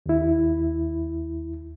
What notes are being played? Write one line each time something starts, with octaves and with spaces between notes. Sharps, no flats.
D#2 E4